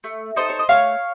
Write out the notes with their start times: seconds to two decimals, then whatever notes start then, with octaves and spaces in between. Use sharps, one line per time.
0.04 A3
0.36 D#4 A4 C5 D#5
0.49 C#5
0.59 D#5
0.69 A3 C#5 F5